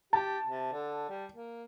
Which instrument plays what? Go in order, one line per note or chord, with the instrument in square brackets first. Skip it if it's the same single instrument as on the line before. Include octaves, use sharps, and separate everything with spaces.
[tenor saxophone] G4 [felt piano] A5
[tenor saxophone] C3
D3
G3
A#3